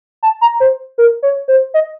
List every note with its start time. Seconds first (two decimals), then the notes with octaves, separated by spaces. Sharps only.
0.23 A5
0.41 A#5
0.60 C5
0.98 A#4
1.23 C#5
1.48 C5
1.74 D#5